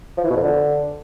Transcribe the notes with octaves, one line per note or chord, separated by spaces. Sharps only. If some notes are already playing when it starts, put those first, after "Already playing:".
F3
E3
B2
F2
D3